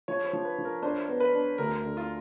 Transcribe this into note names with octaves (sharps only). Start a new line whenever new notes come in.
F3 C#5
C5
F3
B4
F3
A#4
D4 C5
B3
B4
D4
D2 A#4
D3
F4